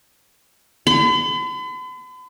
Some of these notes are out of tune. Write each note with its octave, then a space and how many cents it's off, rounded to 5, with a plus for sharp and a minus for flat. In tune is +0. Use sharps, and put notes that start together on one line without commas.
B5 +45